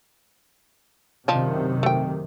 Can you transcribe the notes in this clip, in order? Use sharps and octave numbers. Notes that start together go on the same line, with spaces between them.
F#2 C3 D#3 F3 D4 D#4
A3 G5